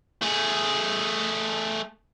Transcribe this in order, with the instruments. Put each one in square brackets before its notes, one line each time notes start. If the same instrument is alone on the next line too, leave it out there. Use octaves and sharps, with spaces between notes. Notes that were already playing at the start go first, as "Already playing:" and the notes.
[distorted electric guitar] A3 G#4